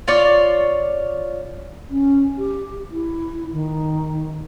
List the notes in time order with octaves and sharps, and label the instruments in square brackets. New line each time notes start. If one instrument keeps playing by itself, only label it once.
[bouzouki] F4 C#5 D5
[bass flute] C#4
G4
E4
D#3